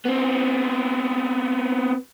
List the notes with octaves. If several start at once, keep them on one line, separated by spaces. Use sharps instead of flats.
B3 C4